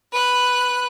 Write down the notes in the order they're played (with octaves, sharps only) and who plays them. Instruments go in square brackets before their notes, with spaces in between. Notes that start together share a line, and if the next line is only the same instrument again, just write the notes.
[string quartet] B4 F#6